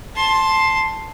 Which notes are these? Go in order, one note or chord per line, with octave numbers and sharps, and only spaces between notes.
A5 C6